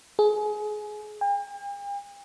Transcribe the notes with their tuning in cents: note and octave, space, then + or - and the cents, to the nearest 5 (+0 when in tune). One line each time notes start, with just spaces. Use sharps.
G#4 +25
G5 +45